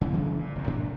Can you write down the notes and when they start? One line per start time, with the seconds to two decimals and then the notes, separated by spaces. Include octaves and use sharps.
0.01 C#3 E3 F#3 B3
0.13 F#1 C#3 E3 F3
0.39 A#2
0.55 F1 D#2
0.67 A2 D4